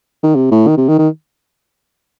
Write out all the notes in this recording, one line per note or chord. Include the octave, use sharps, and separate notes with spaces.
D#3
C3
A2
D#3
C3
D#3
D#3